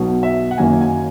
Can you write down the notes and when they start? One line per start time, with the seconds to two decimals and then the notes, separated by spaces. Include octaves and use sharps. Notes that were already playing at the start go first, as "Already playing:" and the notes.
Already playing: B1 B2 F#3
0.23 E5
0.51 F#5
0.58 F#1 F#2 D#3 F#3 A#3 G#5
0.81 G#5